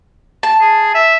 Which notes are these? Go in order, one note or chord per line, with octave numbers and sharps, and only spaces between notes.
A5
G#4
E5